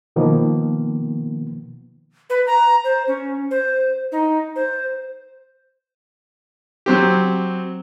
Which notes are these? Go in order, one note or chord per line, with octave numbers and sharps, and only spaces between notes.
B2 D#3 F3 A#3 B3
B4
A#5
C5
C#4
C5
D#4
C5
F#3 C4 G4